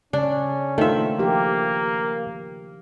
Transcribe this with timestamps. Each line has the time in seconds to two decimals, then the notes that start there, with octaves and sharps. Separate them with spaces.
0.13 C#3 C#4 D4
0.78 D#3 A3 A#3 D4 F4 C5 E5
1.19 F3 A#3 G4 A#4